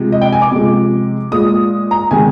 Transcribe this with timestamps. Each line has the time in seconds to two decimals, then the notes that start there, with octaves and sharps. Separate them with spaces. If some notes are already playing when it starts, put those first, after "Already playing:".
Already playing: C3 F3 G#3
0.12 D#5
0.22 G5
0.33 G#5
0.42 D6
0.52 C3 F3 G#3
1.31 A#2 G#3 D#6
1.91 A#5
2.11 C3 D#3 G#3 G#5